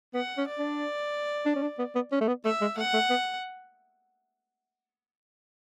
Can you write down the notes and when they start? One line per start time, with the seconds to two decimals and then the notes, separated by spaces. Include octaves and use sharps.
0.14 B3 F#5
0.37 C#4
0.47 D5
0.59 D4
1.46 D4
1.56 C#4
1.62 D4
1.79 B3
1.95 B3
2.12 C#4
2.21 A3
2.28 B3
2.45 A3 E5
2.61 G#3
2.77 A3 F#5
2.94 A3
3.10 B3